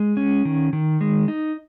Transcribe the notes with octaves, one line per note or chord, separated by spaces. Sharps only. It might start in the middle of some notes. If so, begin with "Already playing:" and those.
Already playing: G#3
C#4
D#3
D#3
G#3
D#4